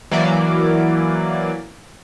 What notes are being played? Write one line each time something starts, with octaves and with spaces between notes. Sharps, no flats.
E3 F#3 A#3 D5